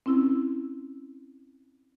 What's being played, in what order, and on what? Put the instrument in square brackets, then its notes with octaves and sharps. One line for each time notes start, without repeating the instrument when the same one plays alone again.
[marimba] C4 C#4 E4 E6